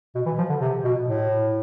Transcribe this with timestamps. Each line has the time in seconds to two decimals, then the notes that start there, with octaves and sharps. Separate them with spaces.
0.15 B2
0.26 E3
0.38 F3
0.49 D3
0.61 C3
0.84 B2
1.07 A2